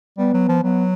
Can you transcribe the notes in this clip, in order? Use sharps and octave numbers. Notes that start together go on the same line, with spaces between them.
G3 B3
F#3
F3
F#3 B3